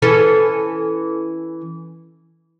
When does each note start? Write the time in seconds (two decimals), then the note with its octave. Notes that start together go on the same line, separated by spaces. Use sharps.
0.02 E3 C#4 A4